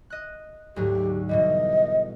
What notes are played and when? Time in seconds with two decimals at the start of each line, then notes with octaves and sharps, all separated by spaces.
0.10 D#5 F#6
0.76 D2 G#2 F#3 G4
1.29 B2 E3 G3 D#5